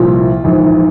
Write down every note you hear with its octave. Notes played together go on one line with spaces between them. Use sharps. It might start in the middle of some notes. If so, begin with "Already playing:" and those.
Already playing: C2 A#2 F3 F4
A#1 G#2 E3